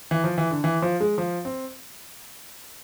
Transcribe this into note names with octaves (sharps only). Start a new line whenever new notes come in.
E3
F3
E3
D3
E3
F3
G#3
F3
C4